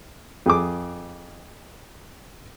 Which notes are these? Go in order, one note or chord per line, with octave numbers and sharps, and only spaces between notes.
F2 G#4 D6